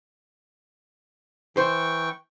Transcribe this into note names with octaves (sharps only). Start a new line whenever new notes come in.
E3 C5 G5 C#6